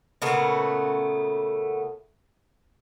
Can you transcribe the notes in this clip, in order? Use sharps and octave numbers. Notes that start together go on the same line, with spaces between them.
A#2 C#3 A3 B3